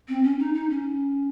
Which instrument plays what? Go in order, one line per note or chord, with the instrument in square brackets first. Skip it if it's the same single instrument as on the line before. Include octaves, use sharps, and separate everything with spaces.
[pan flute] C4
C#4
D#4
D#4
C#4